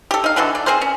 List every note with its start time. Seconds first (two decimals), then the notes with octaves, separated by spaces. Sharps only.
0.11 G4 A4
0.24 D#4 F5
0.36 D3 E3 F#3 A4
0.55 D5
0.66 C4 G#4 A#4 C5
0.82 C#4